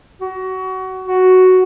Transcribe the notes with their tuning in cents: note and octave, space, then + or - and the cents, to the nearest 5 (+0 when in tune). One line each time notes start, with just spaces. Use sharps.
F#4 +25
F#4 +5